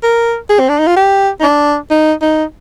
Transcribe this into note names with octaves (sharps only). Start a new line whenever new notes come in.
A#4
G#4
C4
D4
D#4
F4
G4
D#4
D4
D#4
D#4